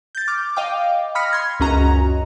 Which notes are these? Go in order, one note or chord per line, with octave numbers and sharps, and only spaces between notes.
G6 A6
D6 F6
D#5 F5 G5 D6
B5 D#6 F6 A#6 B6 C#7
C6 G#6
C#2 F#2 C#4 F#4 D#5 A#5